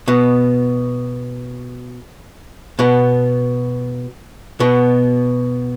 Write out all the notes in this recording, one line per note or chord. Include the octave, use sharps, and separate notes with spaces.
B2 B3
B2 B3
B2 B3